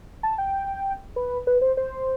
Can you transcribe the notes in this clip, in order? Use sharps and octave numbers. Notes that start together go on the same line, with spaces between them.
A5
G5
B4
B4
C5
C5